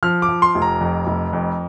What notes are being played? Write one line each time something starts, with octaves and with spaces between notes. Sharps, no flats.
F3 F6
D6
F3
C6
F1
A#5
F2
F1
F2